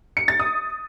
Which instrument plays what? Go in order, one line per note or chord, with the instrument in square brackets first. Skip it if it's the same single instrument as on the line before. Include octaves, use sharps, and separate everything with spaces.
[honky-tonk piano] C#7
A6
D#6